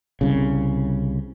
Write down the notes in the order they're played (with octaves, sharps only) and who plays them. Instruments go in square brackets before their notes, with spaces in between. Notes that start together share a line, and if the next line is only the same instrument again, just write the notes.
[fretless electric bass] C2 C#3